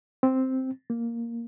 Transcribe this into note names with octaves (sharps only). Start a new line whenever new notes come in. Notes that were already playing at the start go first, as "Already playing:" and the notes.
C4
A#3